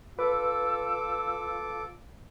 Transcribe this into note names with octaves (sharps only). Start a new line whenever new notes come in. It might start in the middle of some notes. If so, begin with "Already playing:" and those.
F4 A4 B4 D6 E6